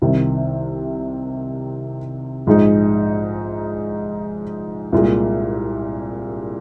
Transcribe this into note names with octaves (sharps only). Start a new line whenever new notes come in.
C2 C3 D#3
A#1 G#2 G#3 D#4
C2 A#2 G#3